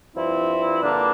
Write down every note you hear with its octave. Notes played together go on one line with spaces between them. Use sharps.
G2 F3 C4 E4
G2 D3 G3 A#3 D4